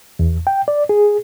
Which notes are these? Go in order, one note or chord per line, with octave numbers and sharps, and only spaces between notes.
E2
G5
D5
G#4